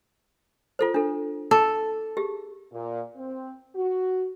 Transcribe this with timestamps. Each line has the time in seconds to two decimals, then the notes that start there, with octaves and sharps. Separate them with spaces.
0.79 F4 A4 C5
0.94 D4 A4
1.51 A4 A5 D6
2.17 G4 G#4
2.73 A#2
3.16 C4
3.75 F#4